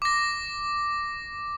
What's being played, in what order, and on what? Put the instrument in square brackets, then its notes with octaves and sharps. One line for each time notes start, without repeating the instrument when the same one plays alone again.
[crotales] D6 A#6